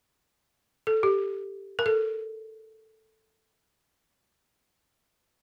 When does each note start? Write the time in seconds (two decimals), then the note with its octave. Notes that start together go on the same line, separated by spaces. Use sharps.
0.87 A4
1.03 G4
1.79 A#4
1.86 A4